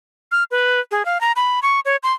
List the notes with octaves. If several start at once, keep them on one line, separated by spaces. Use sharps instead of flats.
F6
B4
G#4
F5
A#5
B5
C#6
C#5
C6